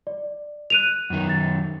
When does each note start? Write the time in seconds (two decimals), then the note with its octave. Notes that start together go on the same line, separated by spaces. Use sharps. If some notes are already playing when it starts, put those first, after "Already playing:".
0.07 D5
0.70 F#6 D#7 F7
1.10 F#2 D#3
1.29 A6